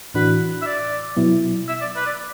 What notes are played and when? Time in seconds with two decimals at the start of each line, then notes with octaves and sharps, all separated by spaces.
0.14 A2 E3 D4 F#4 B4
0.61 E5
0.66 D5
1.17 B2 F#3 B3 E4
1.68 E5
1.81 D5
1.96 B4
2.06 D5